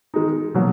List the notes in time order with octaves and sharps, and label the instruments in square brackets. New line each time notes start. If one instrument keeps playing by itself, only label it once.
[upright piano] D#3 G#3 D#4
B2 F#3 A#3